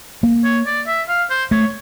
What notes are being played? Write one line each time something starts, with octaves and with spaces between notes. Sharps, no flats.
A#3
C#5
D5
E5
F5
C5
A3 C#5